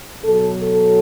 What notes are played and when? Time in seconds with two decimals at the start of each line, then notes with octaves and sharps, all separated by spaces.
0.25 B2 F#3 A4
0.63 A4